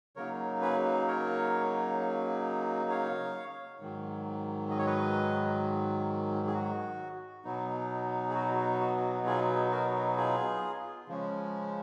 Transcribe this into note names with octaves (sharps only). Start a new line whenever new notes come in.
C#3 F#3 A#3 D#4 A#4 C#5
G#4 B4
A#4 C#5
C#5 F5
G#2 D#3 F#3
D#5
C#5
B4 D#5
G#4
F#4
B2 F#3 B3 D#4
G#4
F#4
F#4
F4 G#4
F#4 A#4
F4 G#4
C#3 F3 G#3 C#4